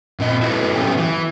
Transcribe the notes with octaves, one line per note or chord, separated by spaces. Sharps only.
A#2 C4 D#5
E4 F#4 A4 B4
A2 F#3 A3 B3 C#4 G4
E3